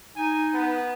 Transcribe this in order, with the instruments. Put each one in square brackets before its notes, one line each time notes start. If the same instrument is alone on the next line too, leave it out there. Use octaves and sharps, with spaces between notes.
[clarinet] D#4 [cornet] G#5
[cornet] B3